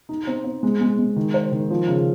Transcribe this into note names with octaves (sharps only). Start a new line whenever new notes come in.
D#4
C4
C4
G#3
G#3
G#3
D#3
C5
D#3
F3
C#3